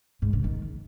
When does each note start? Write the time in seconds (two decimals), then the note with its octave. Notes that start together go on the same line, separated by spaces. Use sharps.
0.22 G#2
0.33 C#3
0.44 D#3